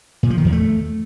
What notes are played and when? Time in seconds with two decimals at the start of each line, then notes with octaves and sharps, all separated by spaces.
0.23 A#2
0.30 F3
0.38 D#3
0.45 E2
0.52 A3